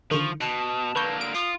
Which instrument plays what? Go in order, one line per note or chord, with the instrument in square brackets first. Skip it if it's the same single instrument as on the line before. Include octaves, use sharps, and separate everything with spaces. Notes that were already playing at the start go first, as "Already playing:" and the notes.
[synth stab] D3 D#3 [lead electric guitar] F3 [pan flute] C#6
[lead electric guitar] B2 [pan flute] A5
[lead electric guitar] D3 A#3 [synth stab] B4 C#6 G6
[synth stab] D7
[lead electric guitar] F4 [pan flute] D#6